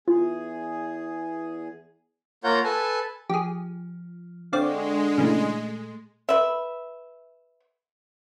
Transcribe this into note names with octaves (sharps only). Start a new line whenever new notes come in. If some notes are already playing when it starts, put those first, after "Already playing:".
E2 F4 G#4
A#3 F4 A#4 C#5 F#5 G6
A4 B4 G#5 A5
F3 G4 G#4
D3 G#3 C4 D4 D5 F5 G5 C#6
A#2 C#3 E3 A3
B4 E5